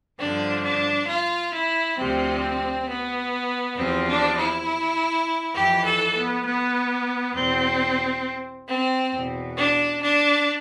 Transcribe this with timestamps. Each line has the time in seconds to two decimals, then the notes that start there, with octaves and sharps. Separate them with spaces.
0.20 G2 D3 F3 D4
0.65 D4
1.09 F4
1.54 E4
1.98 D2 C3 F3 C4
2.88 B3
3.77 E2 C3 F3 C4
4.07 D4
4.37 E4
5.56 F2 E3 G4
5.86 A4
6.16 B3
6.45 B3
7.35 E2 B2 C4
8.69 C4
9.13 E2 B2
9.58 D4
10.02 D4